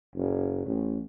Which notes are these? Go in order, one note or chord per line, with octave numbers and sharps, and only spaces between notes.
F#1
A1